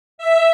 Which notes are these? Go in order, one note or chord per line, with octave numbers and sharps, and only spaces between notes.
E5